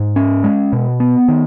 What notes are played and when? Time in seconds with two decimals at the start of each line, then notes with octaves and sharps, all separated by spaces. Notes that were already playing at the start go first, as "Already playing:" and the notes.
Already playing: G#2
0.16 C#4
0.44 G#3
0.73 B2
1.00 B3
1.28 D#3